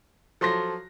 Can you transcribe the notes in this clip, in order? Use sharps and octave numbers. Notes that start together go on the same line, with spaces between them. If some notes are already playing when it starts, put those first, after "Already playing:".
F3 F#3 A4 C6 A#6